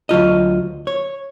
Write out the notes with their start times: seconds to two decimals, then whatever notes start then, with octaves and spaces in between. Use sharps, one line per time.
0.09 D2 F#3 F4 D#5
0.87 C#5